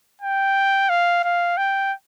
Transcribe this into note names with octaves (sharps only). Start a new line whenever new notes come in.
G5
F5
F5
G5